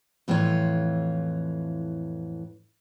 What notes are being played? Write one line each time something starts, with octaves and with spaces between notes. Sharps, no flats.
F2 A2 E3 F4 C#5